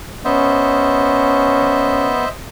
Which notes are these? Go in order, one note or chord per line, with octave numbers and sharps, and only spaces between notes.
B3 C#4 C5 D#5 E5